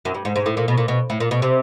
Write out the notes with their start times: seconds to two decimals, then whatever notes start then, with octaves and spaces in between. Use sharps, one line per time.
0.05 F#2
0.14 G2
0.25 G#2
0.36 G#2
0.46 A2
0.57 A#2
0.68 B2
0.78 A#2
0.88 B2
1.10 A2
1.20 A#2
1.31 B2
1.42 C3